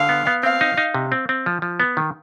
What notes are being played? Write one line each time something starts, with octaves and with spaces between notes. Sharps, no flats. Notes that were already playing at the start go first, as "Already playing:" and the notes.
Already playing: D3 F5
B3
B3
C4 F5
D#4
D#4
C3
C4
C4
F3
F3
B3
D#3